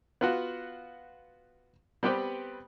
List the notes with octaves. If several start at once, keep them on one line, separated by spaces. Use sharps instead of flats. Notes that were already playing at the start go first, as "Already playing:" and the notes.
B3 F4 F#4
G3 B3 C4 G4 B4